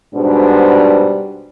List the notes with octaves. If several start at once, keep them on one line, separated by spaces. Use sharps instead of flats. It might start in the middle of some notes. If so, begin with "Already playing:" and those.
G#2 B2 G3 D4 C5